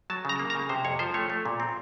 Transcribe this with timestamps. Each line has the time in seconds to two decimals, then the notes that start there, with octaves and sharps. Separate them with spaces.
0.10 F#3 A5
0.25 C#3 A#5
0.39 A#3
0.50 A#5
0.55 C#3
0.69 C3 C5
0.85 F2 C#5
0.99 F3 C5
1.14 A3 C#5
1.30 A3
1.45 A#2
1.60 C4